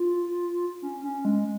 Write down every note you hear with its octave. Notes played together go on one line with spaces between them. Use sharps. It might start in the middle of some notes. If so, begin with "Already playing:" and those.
Already playing: F4
C#4
C#4
G#3